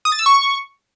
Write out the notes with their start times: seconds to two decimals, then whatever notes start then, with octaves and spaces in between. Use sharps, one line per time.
0.05 D#6
0.12 A6
0.19 E6
0.26 C#6